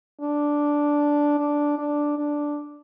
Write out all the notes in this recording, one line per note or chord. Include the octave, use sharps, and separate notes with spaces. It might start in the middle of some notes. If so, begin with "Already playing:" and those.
D4
D4
D4
D4